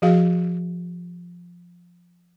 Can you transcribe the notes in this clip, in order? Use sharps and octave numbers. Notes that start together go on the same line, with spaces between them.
F3 F#4 G#4 F5